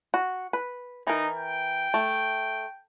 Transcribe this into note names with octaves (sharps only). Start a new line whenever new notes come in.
F#4
B4
E3 D#4 A#4
G5
A3